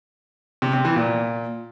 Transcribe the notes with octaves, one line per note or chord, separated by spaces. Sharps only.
C3
C3
E3
A#2